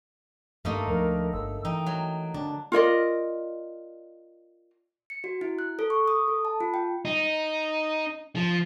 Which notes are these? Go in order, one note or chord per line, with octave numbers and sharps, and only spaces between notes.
G2 A3 A#3 D#4
D2 F3 A#4
G1 E6
E3 D#4 G5
F#3
D3 D4
F4 A#4 D5 D#5
C#7
F#4
E4
F#6
A4
C#6
D#6
A4
A5
F4
G5
D#4
F3